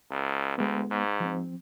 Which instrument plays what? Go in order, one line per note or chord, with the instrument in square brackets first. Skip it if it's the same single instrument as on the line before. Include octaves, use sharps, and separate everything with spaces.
[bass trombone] C#2
[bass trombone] D2 [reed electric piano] G#3 B3
[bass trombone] G#2
[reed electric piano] F3 C4